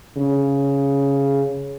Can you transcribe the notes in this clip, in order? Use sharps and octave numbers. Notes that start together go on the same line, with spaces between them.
C#3